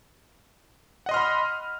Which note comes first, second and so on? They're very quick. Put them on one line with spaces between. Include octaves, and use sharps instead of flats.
F#5 D#5 C6 F6 B5